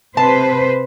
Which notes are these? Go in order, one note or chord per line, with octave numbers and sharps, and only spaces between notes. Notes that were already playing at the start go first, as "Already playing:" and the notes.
C3 B4 C5 A5